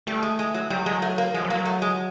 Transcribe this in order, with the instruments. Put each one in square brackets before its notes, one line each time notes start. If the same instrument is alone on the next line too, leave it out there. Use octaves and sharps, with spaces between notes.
[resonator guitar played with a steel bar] G3 [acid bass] A3
[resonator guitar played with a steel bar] G#3
G#3
F#3
[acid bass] F#3 [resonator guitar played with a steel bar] G3
[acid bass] F#3 [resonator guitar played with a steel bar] G#3
[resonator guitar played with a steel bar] A3
A#3
[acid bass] F3 [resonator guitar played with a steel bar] G#3
[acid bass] F#3
[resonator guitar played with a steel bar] A#3
[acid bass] F#3
[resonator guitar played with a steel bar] A3
G#3